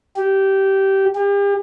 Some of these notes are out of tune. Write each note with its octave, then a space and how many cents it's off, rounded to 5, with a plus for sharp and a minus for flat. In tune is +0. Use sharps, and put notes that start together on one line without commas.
G4 -15
G4 +40